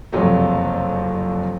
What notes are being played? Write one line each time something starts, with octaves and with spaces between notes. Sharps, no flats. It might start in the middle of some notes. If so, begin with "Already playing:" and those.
F#1 F2 C3 F#3 A3